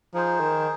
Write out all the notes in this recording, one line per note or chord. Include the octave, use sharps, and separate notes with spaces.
F3 D#4 G#4 C5
D#3